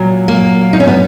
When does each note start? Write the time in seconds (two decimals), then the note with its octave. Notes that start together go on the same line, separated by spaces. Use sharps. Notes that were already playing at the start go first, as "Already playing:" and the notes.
Already playing: A#2 F#3
0.28 A#3
0.73 D#4
0.80 C#4
0.87 B3